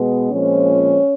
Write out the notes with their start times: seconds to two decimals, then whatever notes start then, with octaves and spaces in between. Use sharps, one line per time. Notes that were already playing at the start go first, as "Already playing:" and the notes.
Already playing: B2 G#3 B3
0.31 A#2 F3 G#3 C4 C#4